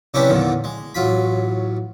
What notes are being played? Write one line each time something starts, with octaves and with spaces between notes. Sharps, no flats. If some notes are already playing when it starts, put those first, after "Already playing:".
C3 C#4 D4 E4 G4 B4
E2 A#2 D3 D#3
G#3
A1 F#3 F4 B5